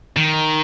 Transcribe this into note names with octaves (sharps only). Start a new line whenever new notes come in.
D#3